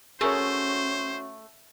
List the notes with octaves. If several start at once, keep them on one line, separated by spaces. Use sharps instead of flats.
A3 C#4 F#4 G#4 A#4 C5 C#5